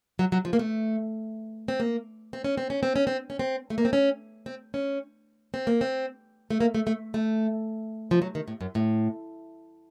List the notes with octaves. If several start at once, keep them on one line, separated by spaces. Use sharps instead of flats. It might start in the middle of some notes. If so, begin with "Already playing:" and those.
F#3
F#3
F3
A#3
A3
C4
A#3
C4
C#4
C4
C#4
C4
C#4
C4
C#4
C4
A3
A#3
C4
C#4
C4
C#4
C4
A#3
C4
A3
A#3
A3
A3
A3
F3
F#3
D#3
A2
F#2
A2